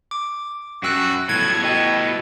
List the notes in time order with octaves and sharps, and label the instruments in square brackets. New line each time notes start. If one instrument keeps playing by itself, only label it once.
[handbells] D6
[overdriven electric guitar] F#2 [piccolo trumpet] F#4 [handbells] G5 E6 F#6
[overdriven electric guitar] A2 B3 [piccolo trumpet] A4 [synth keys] G#6
[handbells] F#4 D#5 G5